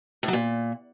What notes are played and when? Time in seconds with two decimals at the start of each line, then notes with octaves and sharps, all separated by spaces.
0.23 A2
0.28 F#3
0.33 A#2